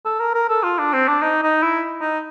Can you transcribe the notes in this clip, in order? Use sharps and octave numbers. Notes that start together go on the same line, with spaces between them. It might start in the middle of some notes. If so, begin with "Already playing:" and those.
A4
A#4
A#4
A4
F4
D4
C4
D4
D#4
D#4
E4
D#4